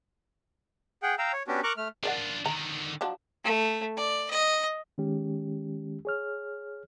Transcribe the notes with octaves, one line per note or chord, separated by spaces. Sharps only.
G#4 F#5 G5
F5 G5 A#5 E6
C#5
B3 C#4 D4 F#4 G4
A#4 A#5 C#6 D6 F#6
A3 F6
D4 F4 A#4 D5 F#5
D3 D#3 A#5
F3 F#3 D4
A3
D5
D#5
D#3 G#3 C#4 G4
G#4 C#5 F6